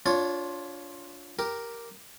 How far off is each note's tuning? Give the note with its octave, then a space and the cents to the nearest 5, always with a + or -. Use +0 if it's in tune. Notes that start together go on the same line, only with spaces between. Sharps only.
D4 -25 F4 +10 C#5 -5
G4 +0 A#4 +0